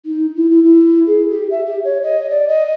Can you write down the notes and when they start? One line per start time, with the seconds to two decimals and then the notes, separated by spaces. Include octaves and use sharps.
0.06 D#4
0.36 E4
0.50 E4
0.64 E4
1.07 G#4
1.30 G4
1.51 E5
1.66 G4
1.84 C#5
2.03 D#5
2.30 D5
2.48 D#5